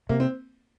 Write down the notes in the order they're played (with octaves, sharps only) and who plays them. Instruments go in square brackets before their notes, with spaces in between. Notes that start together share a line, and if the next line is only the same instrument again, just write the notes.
[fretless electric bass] C3 [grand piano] A#3
[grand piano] C4